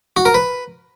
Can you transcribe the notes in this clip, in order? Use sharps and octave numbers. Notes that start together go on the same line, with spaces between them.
F#4
A#4
B4